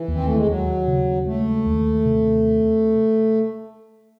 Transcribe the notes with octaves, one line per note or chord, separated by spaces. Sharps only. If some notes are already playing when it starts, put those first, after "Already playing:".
Already playing: E3
D#2
C4
A3
G#3
D#2 F#3
C#3
G#3 A3
D#2
C3